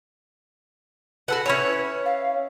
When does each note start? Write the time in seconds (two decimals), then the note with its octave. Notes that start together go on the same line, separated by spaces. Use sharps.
1.28 F#4 A4 B4 F#5
1.46 C#4 E4 C#5
2.05 F5